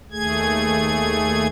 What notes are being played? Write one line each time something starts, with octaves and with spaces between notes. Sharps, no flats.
D#2 A3 G#4 G#6